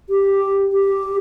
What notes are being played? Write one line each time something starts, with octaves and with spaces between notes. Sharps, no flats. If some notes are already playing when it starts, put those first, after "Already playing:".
G4
G4